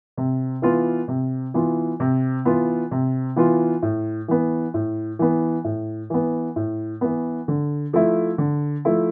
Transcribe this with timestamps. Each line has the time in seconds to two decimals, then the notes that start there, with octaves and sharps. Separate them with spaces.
0.17 C3
0.62 E3 B3 F4
1.08 C3
1.54 E3 B3 F4
2.00 C3
2.45 E3 B3 F4
2.91 C3
3.36 E3 B3 F4
3.82 A2
4.28 E3 B3
4.74 A2
5.19 E3 B3
5.64 A2
6.10 E3 B3
6.56 A2
7.01 E3 B3
7.48 D3
7.93 F3 A3 E4
8.38 D3
8.85 F3 A3 E4